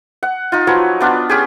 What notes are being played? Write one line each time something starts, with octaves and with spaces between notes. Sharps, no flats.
F#5
D#4 F4
F3 F#3 B4 C#5
B3 D4 F4
C#4 G4 G#4